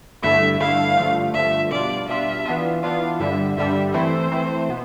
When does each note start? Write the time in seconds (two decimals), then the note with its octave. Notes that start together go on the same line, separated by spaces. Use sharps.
0.22 G2 D3 A3 E4 E5
0.60 G2 D3 A3 E4 F5
0.97 G2 D3 F3 A3
1.34 G2 D3 F3 A3 E5
1.72 B2 G3 D4 F4 D5
2.08 B2 G3 D4 F4 E5
2.45 E3 B3 D4 F4
2.83 E3 B3 D4 F4 F5
3.20 G2 D3 G3 E5
3.57 G2 D3 G3 E5
3.94 E3 A3 C4 E4 C5
4.31 E3 A3 C4 E4
4.69 B2 B3